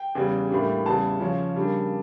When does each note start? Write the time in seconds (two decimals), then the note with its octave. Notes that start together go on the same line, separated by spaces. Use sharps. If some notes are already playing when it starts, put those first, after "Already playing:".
Already playing: G5
0.15 E2 C#3 G3
0.50 A2 E3 G3 A#3 D4
0.86 E2 C#3 G3 A5
1.20 C#3 F3 C#4
1.56 C#3 G3 A#3 D4